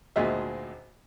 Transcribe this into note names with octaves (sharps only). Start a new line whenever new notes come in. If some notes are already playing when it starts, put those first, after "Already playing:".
G#1 D2 A#2 G#4 D#5 E5